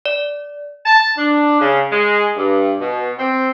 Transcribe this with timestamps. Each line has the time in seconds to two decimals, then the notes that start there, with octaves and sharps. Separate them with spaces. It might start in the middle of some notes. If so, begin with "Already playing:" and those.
0.06 D5
0.86 A5
1.18 D4
1.60 C#3
1.92 G#3
2.36 G2
2.80 B2
3.19 C4